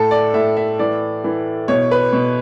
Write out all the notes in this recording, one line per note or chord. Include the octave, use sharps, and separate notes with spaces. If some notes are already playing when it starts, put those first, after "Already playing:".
Already playing: A2 A4
D5
A2 E5
E5
E3 D5
E3
B2 C#5
B4
B2